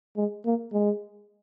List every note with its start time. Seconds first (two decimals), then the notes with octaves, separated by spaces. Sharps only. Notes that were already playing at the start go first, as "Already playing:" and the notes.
0.17 G#3
0.45 A#3
0.73 G#3